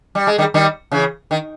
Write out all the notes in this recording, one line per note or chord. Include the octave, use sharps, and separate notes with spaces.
G3
G#3
D#3 G3
D#3 G3
C#3 E3
D#3